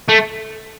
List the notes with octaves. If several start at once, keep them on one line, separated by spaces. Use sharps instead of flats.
A3